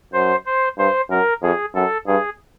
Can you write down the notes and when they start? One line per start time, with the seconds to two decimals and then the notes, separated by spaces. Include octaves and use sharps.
0.13 F#2 C5
0.46 C5
0.78 G2 C5
1.10 F#2 A#4
1.42 F2 G#4
1.74 F#2 A4
2.07 G2 G#4